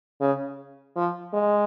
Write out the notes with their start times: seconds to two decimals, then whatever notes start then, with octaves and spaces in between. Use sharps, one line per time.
0.21 C#3
0.96 F3
1.33 G#3